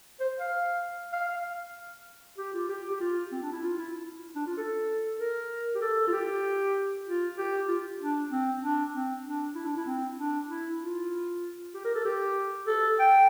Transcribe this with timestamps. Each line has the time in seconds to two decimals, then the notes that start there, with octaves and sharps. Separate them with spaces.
0.20 C5
0.40 F5
1.13 F5
1.29 F5
2.38 G4
2.54 F4
2.69 G4
2.90 G4
3.01 F4
3.32 C4
3.42 D4
3.52 E4
3.63 F4
3.78 E4
4.36 D4
4.46 F4
4.57 A4
5.19 A#4
5.75 G4
5.81 A4
6.07 F4
6.12 G4
7.06 F4
7.38 G4
7.68 F4
8.00 D4
8.31 C4
8.62 D4
8.93 C4
9.25 D4
9.55 E4
9.66 D4
9.77 E4
9.86 C4
10.19 D4
10.49 E4
10.81 F4
11.74 G4
11.85 A#4
11.95 A4
12.05 G4
12.67 A4
13.00 G5